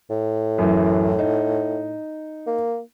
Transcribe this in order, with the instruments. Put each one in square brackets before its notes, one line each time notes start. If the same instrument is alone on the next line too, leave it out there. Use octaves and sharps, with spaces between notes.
[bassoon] A2
[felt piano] F#2 E3
D#4
[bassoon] A#3